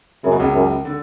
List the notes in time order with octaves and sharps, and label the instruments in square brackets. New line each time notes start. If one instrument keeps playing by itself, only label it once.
[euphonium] F#2 [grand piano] C#3
[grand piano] B2
C#2 C#3
[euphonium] F#2
[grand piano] D3